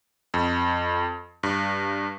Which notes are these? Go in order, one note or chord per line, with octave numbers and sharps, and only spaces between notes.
F2
G2